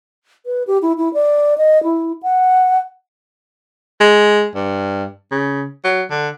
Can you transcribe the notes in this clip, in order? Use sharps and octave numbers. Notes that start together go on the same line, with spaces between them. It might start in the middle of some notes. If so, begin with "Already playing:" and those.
B4
G4
E4
E4
D5
D#5
E4
F#5
G#3
G2
C#3
F#3
D3